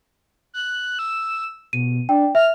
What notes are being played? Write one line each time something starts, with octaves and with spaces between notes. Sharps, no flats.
F#6
E6
B2 D#7
D4 G5
E5 F6